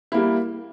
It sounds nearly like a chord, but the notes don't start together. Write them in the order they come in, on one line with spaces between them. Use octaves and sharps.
E4 A#3 G3